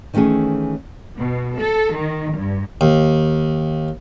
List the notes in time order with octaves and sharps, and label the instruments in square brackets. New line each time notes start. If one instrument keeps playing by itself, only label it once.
[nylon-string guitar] D#3 E3 A3 C#4 G#4
[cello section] B2
A4
D#3
G2
[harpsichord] D#2